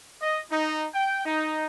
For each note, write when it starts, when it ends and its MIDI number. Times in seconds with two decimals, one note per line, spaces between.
0.22 0.40 75
0.51 0.88 63
0.94 1.23 79
1.25 1.65 63